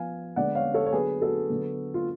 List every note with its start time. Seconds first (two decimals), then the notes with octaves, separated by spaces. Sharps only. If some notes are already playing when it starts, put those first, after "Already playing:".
Already playing: F3 B3 F5 G#5
0.36 D3 G#3 B3 D5 F#5
0.55 C#5 F5
0.74 A4 C#5
0.86 C#5
0.92 D3 F#3 B3 G#4 B4
1.22 F#4 A4
1.50 D3 F#3 B3
1.94 F4